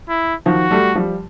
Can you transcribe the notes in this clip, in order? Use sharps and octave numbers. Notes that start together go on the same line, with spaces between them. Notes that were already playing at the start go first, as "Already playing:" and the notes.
E4
D#3 F3 F#4
G3 A3
F3 G3